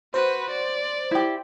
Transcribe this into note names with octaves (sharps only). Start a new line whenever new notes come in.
F#4 B4 C5
D5
E4 G4